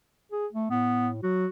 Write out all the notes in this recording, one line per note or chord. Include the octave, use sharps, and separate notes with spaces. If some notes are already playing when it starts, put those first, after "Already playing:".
G#4
A3
A2 B3
F#3 F#4